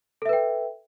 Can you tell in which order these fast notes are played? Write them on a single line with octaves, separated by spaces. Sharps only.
A4 E5 B4 G5